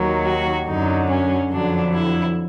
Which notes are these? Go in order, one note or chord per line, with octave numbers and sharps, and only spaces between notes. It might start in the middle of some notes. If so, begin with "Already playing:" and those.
Already playing: D#2 D#3 F#3
F#4
F#2 D3 F#3 D#4
C#4
F2 D3 F#3 D4
E4